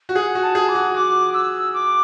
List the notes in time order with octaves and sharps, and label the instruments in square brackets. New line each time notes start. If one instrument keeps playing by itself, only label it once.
[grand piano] F#4
[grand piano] G#4 [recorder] F#5
[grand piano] F#4
[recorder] A5
[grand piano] G#4
[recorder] D6
[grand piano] F#4
[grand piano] F#4 [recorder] D6
[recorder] E6
D6